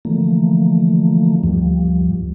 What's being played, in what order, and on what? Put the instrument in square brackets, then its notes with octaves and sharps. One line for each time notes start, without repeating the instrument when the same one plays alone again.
[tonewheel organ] D3 E3 F3 A3 A#3
D2 G2 F3 G3